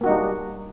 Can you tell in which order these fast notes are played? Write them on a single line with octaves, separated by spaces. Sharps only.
A#3 F#4 D#4 G3 D4